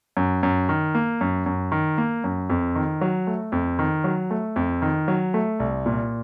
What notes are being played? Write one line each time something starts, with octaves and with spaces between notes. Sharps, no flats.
F#2
F#2
D#3
A#3
F#2
F#2
D#3
A#3
F#2
F2
D#3
F#3
A3
F2
D#3
F#3
A3
F2
D#3
F#3
A3
C2
A#2